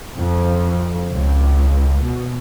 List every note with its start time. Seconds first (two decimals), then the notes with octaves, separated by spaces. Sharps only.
0.18 F2
1.12 C#2
2.03 B2